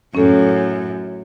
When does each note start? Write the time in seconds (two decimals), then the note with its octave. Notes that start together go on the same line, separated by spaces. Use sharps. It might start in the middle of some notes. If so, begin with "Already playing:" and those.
0.15 F#2 A2 C#4 A4